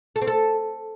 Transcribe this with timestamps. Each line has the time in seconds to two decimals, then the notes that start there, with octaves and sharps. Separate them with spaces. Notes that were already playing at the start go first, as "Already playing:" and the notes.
0.16 A4
0.22 C4
0.27 A4